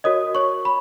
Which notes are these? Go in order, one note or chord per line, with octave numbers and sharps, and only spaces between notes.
F#4 A#4 C#5 D#5 D#6
C#5 C#6
B5